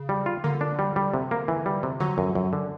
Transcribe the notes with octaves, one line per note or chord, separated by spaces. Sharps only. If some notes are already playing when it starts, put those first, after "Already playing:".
Already playing: C#3
G3
F4
D3 A#3
D4
G3
G3
C3
A#3
E3
G3
C3
D3 F#3
F#2
F#2
D3